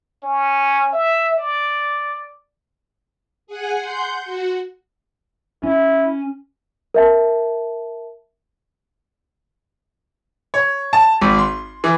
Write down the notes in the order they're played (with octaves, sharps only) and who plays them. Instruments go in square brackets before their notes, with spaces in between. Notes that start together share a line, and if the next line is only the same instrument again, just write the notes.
[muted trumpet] C#4
E5
D5
[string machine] G#4 F#5 G#5
F#5 C6 G6
F#4
[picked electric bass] C#4 [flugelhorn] E4
[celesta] A#4 E5 A5
[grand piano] C#5
A5
G#1
C6
E3